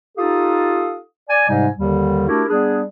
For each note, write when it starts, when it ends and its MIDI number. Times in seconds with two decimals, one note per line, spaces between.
0.18 0.98 63
0.18 0.98 65
0.18 0.98 67
0.18 0.98 69
0.18 0.98 77
0.18 0.98 87
1.29 1.47 74
1.29 1.47 80
1.48 1.67 44
1.48 1.67 48
1.48 1.67 55
1.48 1.67 56
1.48 1.67 63
1.48 1.67 80
1.77 2.28 39
1.77 2.28 50
1.77 2.28 51
1.77 2.28 55
2.28 2.43 57
2.28 2.43 62
2.28 2.43 64
2.28 2.43 66
2.28 2.43 67
2.28 2.43 70
2.49 2.83 55
2.49 2.83 59
2.49 2.83 62
2.49 2.83 68